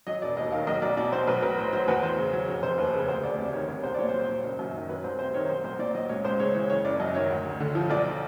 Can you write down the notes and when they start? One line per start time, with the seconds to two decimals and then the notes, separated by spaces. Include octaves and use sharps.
0.07 F#3 D#5
0.22 E1 D5
0.37 D#2 D#5
0.52 D#3 F5
0.67 B1 D#5
0.82 B1 D5
0.97 B2 D5
1.12 F#3 C5
1.27 B1 B4
1.42 B1 B4
1.58 A2 C5
1.73 F#3 C5
1.88 E2 B4
2.03 E2 C5
2.18 C#3
2.33 F#3
2.48 F1 C#5
2.63 F1 C5
2.78 D#2 B4
2.93 C#3
3.00 C#5
3.08 D2 C5
3.23 D2 D5
3.38 C3 D5
3.53 D#3 C#5
3.68 C2 C#5
3.83 C2 C5
3.94 D5
3.99 A#2 C#5
4.09 C5
4.14 F#3
4.19 C5
4.29 F#3
4.44 F#1
4.59 F#2
4.74 D#3
4.89 F#3 B4
5.04 C2 C5
5.19 C3 C5
5.34 D#3 C#5
5.49 B1 C5
5.64 B1 C5
5.79 A#2 D5
5.94 F#3 D#5
6.09 C#2 C#5
6.25 C#2 C5
6.39 C#3 C#5
6.55 E3 C#5
6.70 F#1 C#5
6.85 F#1 D5
7.00 F#2 D#5
7.15 D#3 C#5
7.30 D2
7.45 D2
7.60 D3
7.75 F3
7.90 B1 D5